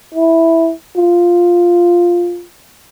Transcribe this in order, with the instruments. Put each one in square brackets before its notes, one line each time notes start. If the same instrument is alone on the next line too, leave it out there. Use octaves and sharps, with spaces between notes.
[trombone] E4
F4